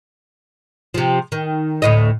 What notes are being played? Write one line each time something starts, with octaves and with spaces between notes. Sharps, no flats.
C3 F3
D#3
D2 A2 D#5